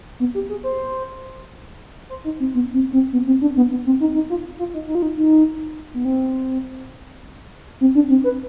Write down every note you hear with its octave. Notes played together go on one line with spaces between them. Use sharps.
B3
G4
G#4
C5
C5
D#4
C4
B3
C4
C4
B3
C4
D4
B3
B3
C4
D#4
D#4
F4
F4
D#4
D#4
F4
D#4
D#4
B3
C4
C4
D4
C4
B4